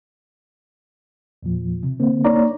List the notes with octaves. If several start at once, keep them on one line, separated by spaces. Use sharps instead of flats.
E2 A#2 F3
C3
D3 A#3 C4
A#3 D4 D#4 C#5 D5 A#5